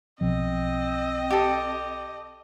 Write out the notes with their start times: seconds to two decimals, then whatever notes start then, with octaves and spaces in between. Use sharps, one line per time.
0.21 B1 B2 F3 C4 D#5
1.30 G4 A4